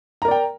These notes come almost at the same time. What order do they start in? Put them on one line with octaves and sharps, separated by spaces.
A#5 A#4 D5 G5